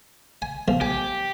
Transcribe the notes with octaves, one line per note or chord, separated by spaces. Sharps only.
G#5
B1 F3
G4 G#5